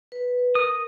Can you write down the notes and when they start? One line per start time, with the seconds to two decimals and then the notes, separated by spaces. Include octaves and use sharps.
0.12 B4
0.55 A#4 D#6